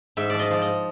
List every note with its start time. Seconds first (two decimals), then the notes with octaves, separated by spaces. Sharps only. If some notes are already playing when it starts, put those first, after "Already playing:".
0.17 G#2 E5
0.30 F3 D5
0.39 D#5
0.51 F3 D5
0.62 D#5